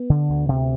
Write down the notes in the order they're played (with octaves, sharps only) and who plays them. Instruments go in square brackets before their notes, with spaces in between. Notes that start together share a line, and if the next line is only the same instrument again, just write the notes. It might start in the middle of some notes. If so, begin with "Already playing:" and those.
Already playing: [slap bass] B3
D3
D2
C3